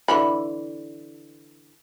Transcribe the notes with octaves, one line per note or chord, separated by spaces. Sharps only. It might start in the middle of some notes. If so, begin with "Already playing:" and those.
D3 E3 B5